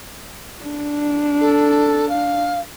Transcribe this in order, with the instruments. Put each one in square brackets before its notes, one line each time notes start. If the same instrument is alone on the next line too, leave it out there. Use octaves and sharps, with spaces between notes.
[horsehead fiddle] D4
[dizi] A4
F5